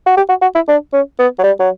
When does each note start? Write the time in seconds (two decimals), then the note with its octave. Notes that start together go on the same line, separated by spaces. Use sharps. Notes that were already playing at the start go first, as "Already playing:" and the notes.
0.06 F#4
0.17 G4
0.29 F#4
0.42 F#4
0.55 E4
0.68 D4
0.93 C#4
1.19 B3
1.39 F#3
1.43 G3
1.59 F#3